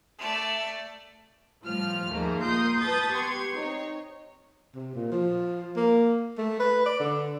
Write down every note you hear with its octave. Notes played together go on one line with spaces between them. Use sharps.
A3 D5
A2 F3 G3 F4 F6
D#2 G#2 F3 A3 A#3
A#2 A#4 C6 D#6 G6
B4 A5 B5 D#6 G6 A6
B3 G4 B4 C6 C#6 G#6
C4 D#4 C#5
C3
A#2
F3
A#3
A3
B4
D5
D3